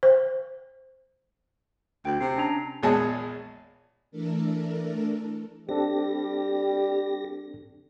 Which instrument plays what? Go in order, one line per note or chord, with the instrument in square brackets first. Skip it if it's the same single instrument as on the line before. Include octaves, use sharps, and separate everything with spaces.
[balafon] C5
[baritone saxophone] D2 [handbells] G5
[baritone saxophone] C3 [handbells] C7
[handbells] C#4 D4 A#5
[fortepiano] A#1 E2 G#3 G#4 C#5 A5
[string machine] E3 A3 D4 A4 A#4
[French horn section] G3 [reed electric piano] C4 D4 A4 [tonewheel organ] G4 A#6